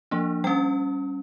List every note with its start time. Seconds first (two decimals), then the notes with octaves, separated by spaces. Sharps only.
0.11 F3 A#3 D4
0.44 G3 C#4 G5